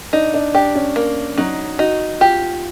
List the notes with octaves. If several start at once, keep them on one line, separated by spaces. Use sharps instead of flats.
D4 D#4
D4
D4 G4
C#4
A#3
F#3 D#4
D#4 F#4
F4 G4